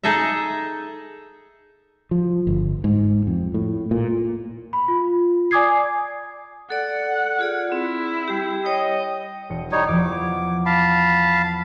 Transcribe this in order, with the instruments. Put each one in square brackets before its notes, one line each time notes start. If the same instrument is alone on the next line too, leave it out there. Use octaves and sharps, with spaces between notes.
[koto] D#4 G#4 A4 D#5 E5
[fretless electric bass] F3
G1
G#2
F2
A2
A#2
[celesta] B5
F4
D5 G#5 D6 D#6 G#6 C7
[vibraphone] A4 D5 [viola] F#5
[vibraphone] F4 G#4 D5
[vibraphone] C4 [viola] E4
[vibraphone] G3 G4
[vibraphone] C#5 G5 [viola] D#5
[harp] E1 C#7
[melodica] G3 D#4 C#5
[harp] E2 F3 [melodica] D6
[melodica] F5 A5 B5